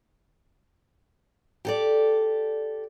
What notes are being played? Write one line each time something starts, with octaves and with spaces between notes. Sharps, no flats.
G4 A4 D5